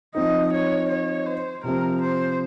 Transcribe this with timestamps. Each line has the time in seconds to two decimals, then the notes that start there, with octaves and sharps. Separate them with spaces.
0.15 F3 C4 D#4 D#5
0.53 C#5
0.89 C#5
1.26 C5
1.64 C3 F3 C4 A#4
2.01 C5